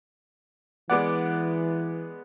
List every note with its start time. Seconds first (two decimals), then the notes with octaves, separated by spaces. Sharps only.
0.90 E3 G#3 B3 D5 F#5 D6